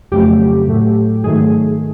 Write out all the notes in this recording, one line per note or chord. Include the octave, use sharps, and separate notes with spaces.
F2 C#3 F#3 A3 G4
A2 F#3 A3
G#2 D#3 F#3 A3 G#4